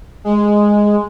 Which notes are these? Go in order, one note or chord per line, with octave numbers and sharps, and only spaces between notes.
G#3